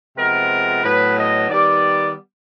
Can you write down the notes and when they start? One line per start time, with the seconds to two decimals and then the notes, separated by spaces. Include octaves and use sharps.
0.17 C3 F3 G#3 B3 A#4
0.84 A2 F#3 B3 B4
1.18 D#5
1.49 D#3 G3 B3 D5